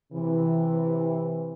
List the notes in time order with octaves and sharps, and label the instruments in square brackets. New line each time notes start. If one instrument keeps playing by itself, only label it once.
[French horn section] C3 E3